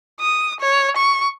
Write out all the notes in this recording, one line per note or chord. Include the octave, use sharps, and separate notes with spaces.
D#6
C#5
C#6